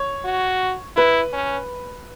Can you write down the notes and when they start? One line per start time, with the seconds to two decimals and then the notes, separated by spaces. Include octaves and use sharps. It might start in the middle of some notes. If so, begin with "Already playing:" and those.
Already playing: C#5
0.25 F#4
0.96 E4 B4
1.33 C#4